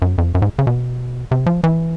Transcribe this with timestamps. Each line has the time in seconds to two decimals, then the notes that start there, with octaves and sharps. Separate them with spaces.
0.02 F#2
0.18 F2
0.35 F#2
0.42 G#2
0.59 C#3
0.67 B2
1.31 C3
1.46 F3
1.64 E3